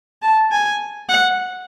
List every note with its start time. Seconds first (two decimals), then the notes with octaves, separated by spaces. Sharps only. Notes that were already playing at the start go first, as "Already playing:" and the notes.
0.22 A5
0.51 G#5
1.09 F#5